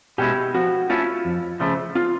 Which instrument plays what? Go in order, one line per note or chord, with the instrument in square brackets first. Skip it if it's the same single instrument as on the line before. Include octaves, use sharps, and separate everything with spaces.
[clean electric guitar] B2 G#3 C#4 E4 [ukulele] G4
[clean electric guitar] F3 [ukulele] F#4
[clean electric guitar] A3 C#4 E4 [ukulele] F4
[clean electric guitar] F2
C#3 F3 A3
[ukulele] F4